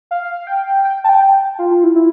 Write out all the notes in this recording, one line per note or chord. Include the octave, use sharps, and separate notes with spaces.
F5
G5
G5
A5
G5
F4
F4
E4
E4